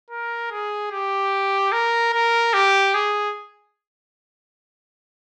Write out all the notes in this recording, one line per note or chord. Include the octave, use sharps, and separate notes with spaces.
A#4
G#4
G4
A#4
A#4
G4
G#4